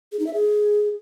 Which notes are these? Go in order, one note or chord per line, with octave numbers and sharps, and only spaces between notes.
G#4
D#4
E5
G#4